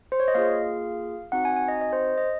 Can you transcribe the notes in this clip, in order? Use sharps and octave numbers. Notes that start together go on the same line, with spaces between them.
C5
C#5
D#5
A#3 F4 G#4 F5
C4 D#4 F#4 F#5
G#5
G#5
D#5
D#5
C5
D#5